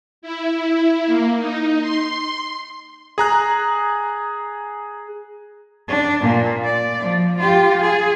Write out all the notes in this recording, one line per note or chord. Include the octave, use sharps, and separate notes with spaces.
E4
A#3
D#4
C6
G#4 A#5 F#6
D4
A#2 A#3
D5
F3
F4 G4
G#4